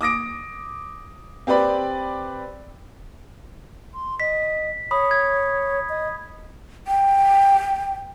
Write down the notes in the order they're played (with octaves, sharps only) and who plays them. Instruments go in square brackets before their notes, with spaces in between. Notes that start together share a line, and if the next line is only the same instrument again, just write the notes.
[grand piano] D6 D#6 A#6 D7
C4 G4 B4 D5 B5
[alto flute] C6
[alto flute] D#5 [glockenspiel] B6
[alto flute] C#5 [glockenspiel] B5 D#6
[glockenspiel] G#6
[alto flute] D#5
[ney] G5